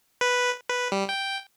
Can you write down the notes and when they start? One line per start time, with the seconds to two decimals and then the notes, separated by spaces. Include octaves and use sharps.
0.21 B4
0.70 B4
0.92 G3
1.09 G5